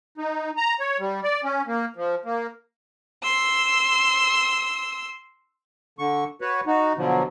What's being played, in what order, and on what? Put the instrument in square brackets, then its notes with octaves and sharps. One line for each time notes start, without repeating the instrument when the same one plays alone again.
[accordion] D#4
A#5
C#5
G3
D5
C#4
A#3
F3
A#3
[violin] C6 E6
[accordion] D3 C#6
F#4 B4 C#5
D#4 F#4
B2 D3 F3 F#3